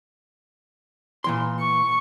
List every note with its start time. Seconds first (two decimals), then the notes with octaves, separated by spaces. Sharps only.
1.24 A#2 E3 C6
1.60 C#6